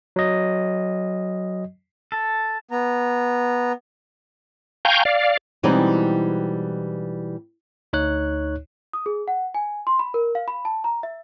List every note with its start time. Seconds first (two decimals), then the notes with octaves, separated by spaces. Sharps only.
0.16 F#3 D#5
2.12 A4
2.71 B3 A#5
4.85 F5 G5 G#5 A#5 C#6 G6
5.05 D5 F5
5.63 B2 E3 G3 G#3 C4 D#4
7.93 D2 D#4 C#5 F#6
8.93 D#6
9.06 G#4
9.28 F#5
9.55 G#5
9.87 C6
9.99 B5
10.14 A#4
10.35 F5
10.48 B5
10.65 A5
10.84 A#5
11.03 E5